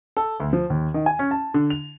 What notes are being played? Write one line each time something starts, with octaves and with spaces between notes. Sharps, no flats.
A4
D2
F3
D#2
D#3
G#5
C#4
A5
D3
F7